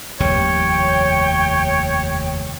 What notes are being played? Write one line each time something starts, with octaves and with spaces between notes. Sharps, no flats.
F1 D#2 G3 C#5 G5